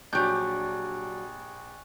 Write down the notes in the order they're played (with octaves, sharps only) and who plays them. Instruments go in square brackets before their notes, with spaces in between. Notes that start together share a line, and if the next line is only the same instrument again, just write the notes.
[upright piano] A#1 [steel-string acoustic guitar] F#3 D4 [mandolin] G4 G6 [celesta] G#5 C#6 F#6